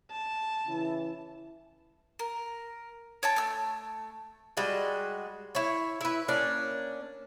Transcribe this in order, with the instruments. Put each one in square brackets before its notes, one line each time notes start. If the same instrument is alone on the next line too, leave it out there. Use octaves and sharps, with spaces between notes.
[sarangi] A5
[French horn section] C#3 E3 E4
[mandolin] A#4
C#5 G5 A5
A3 E6
[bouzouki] G3 G#3 F#4 D#5
E4 C#5
E4 B4
A#3 C#4 D4 D5